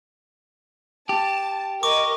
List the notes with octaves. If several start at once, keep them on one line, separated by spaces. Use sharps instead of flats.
G4 A5
A#4 D#5 C#6 D6